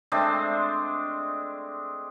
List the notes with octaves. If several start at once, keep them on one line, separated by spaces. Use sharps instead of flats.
G#3 A3 C4 D4